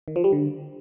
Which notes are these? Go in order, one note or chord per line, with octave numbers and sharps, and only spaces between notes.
D#3
F3
G3
D3